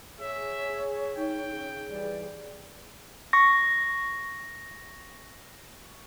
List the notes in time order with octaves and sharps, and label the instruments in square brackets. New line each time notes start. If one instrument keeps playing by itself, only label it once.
[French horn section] G#4 [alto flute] C#5 [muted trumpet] E5
[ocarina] D#4 [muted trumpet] G5
[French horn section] C#3 [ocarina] G#4
[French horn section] E3 G3 [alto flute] D5
[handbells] C#6 A#6